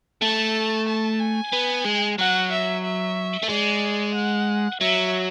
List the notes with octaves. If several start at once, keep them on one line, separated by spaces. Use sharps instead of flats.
A3 A5
A5
G#5
B3
G#3
F#3 F#5
E5
E5
A3
G#3 D5
F#5
F#3 E5